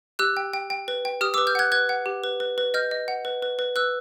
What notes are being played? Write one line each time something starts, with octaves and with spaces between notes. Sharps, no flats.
G4 E6 F#6
G5
G5
G5
B4
G5
G4 D#6 F6
D6 E6
B4
F6 G6
F#5 F#6 G#6
B4 F#6 G#6
F#5
G4
B4
B4
B4
D#5 F6 G6
D#5
F#5
B4
B4
B4
B4 E6 F#6